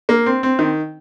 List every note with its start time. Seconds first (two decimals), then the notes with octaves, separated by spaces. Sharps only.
0.09 A#3
0.26 C4
0.43 C4
0.59 D#3